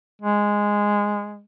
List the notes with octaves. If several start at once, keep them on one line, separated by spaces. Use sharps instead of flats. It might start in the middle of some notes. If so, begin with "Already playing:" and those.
G#3